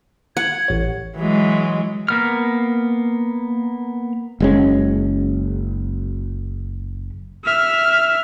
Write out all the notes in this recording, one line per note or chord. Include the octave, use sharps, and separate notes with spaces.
F#5 G#6
A1 C#5
E3 F#3 G#3
A#3 B3 F6
F#1 G#3 C#4
E5 F6